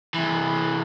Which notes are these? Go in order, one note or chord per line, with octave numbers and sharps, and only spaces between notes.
C3 E3